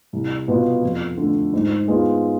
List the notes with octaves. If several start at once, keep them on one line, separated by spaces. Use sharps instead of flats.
C2
B2 B3 F4
F2
D3 A3
G#2
G#3 B3 F4